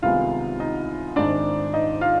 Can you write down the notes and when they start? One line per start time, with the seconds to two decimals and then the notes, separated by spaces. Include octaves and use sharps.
0.02 C2 C3 D#3 G#3 B3 F4 F5
0.60 D#4 D#5
1.16 G#2 D#3 G#3 C4 D4 D#4 D5
1.73 D#4 D#5
2.01 F4 F5